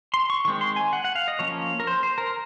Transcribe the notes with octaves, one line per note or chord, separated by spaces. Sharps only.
C6
C#6
D#3 G#3 C4 C#6
C6
G#5
F#5
F#5
F5
D#5
F3 A#3 C#4 C#5
A#4
C5
C5
A#4